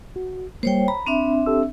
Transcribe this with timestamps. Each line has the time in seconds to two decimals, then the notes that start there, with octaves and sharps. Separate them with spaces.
0.16 F#4
0.63 G3 A#3 C5 C#5 G5
0.88 A#5 B5
1.06 C4 D4 E5
1.46 G4 A4 E6